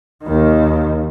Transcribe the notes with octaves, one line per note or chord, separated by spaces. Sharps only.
D#2 D#3